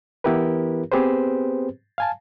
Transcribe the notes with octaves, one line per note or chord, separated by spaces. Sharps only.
E3 B3 E4 G4 A#4 B4
B3 C4 G4 G#4 B4 C5
F5 G#5 A5